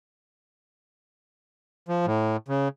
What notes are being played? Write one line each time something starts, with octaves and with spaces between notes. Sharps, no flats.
F3
A2
C#3